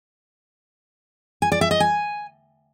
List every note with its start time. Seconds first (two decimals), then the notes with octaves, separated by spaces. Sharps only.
1.42 G#5
1.52 D5
1.61 E5
1.71 D#5
1.80 G#5